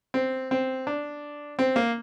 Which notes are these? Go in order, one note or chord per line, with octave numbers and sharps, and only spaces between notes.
C4
C4
D4
C4
A#3